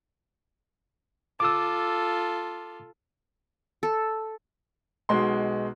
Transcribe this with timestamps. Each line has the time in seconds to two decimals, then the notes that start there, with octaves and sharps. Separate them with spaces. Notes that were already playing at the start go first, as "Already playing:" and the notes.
1.40 F4 A4 D6 E6
3.83 A4
5.09 B1 B2 G#3 C6